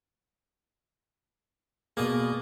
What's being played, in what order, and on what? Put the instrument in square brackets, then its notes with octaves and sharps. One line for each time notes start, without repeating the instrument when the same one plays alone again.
[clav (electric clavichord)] B2 A#3 [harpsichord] G#4 D5 D#5